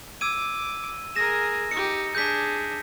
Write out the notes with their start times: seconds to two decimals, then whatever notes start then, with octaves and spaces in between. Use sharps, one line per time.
0.21 D6 E6 G#6 D#7
1.16 G#4 A#4 A#6 E7
1.71 D#4 G4 C#7
2.15 D4 G#4 G6 B6